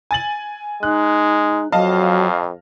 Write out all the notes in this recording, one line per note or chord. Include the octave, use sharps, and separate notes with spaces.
G#5 A6 F#7
G#3 D#4 F#6
F2 F#3 D#5 F5 A5